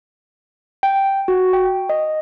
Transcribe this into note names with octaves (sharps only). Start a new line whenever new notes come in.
G5
F#4
G5
D#5